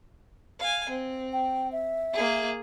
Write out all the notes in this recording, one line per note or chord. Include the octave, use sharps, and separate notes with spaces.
F5 G#5
C4
G5
E5
A#3 G#4